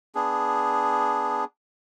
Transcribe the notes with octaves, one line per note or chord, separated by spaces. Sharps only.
B3 D4 G#4